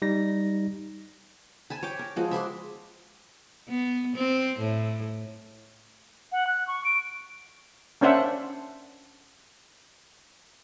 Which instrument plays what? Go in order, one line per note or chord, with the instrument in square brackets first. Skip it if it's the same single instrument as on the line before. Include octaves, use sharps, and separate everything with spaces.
[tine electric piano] G3 D#4 A#6
[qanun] G#5 A5 B5
C#5 G5 D6
A#4
F3 G#3 F#4
E5 B5 C6 D6
[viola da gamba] B3
C4
A2
[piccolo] F#5
F#6
C#6
D7
[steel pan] A#3 C#4 D4 C5 E5 F#5